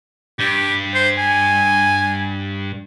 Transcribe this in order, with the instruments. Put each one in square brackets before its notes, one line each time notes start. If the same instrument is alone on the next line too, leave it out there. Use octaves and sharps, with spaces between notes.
[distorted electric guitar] G2 [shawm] G4
[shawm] C5
G#5